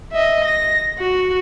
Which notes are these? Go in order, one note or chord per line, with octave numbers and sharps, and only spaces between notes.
D#5 E5
A#6
F#4